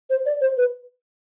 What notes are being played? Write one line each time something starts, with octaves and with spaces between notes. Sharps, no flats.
C5
D5
C5
B4